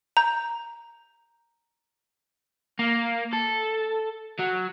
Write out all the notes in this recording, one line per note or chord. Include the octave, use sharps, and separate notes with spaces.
A#5 G6
A#3
A4
F#3